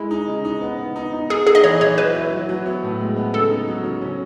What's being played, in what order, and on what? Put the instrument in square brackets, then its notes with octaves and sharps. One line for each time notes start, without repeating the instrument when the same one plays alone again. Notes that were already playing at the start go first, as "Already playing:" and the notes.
Already playing: [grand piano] G#3 [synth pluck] E4
[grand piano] D#4
C#3
D#4
B3
B3
D#4
D#4
[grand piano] D#4 [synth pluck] G#4
[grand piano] D#4 [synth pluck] G#4
[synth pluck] D#5
[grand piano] E3 [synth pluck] C#5
[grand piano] E3 [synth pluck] C#5
[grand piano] F#3 [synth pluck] B4
[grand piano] E4
F#3
F#3
B3
A2
G#3
B3
[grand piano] C#3 [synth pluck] A4
[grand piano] D#4
F#3
C#3
C#4